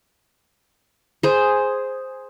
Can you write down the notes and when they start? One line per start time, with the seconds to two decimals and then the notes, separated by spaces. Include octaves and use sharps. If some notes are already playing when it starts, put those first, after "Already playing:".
1.23 G#4 C5